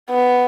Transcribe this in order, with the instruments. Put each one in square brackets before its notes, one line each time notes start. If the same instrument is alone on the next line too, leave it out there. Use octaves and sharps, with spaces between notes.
[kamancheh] B3